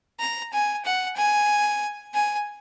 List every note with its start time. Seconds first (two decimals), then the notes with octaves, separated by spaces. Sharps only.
0.20 A#5
0.53 G#5
0.85 F#5
1.16 G#5
2.14 G#5